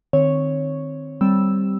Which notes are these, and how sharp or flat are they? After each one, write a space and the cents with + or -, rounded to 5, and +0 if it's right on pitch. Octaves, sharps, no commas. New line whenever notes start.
D#3 -30 C4 +0 C#5 +0
G3 -5 C4 +0 E6 +0